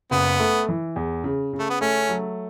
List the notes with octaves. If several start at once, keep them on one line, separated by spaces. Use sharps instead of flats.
F#1 B3
A3
E3
E2
C#3
C#3
A3
B3
A3 C#4
F#3